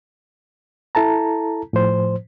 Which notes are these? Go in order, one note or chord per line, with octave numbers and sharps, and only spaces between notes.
E4 A4 A5 A#5
A2 F3 C5